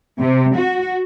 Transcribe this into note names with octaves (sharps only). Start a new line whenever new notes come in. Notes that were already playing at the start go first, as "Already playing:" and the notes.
C3
F#4